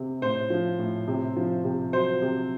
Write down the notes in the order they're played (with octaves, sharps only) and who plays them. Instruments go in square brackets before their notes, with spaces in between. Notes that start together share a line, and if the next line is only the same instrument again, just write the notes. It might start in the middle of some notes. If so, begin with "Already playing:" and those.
Already playing: [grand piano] C3
A2 C5
F3
A2
C3
F3
C3
F#3 C5
C3